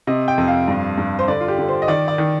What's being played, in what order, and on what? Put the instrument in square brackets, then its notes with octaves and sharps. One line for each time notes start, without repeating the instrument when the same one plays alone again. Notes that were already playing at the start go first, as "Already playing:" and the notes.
[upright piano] C3 D#5
G5
F2
F5
G2
G2
C5
D3 D5
F4
G4
D3
C5
D#5
D#3 D5
D5
D#3